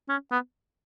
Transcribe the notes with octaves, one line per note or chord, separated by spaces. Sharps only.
C#4
B3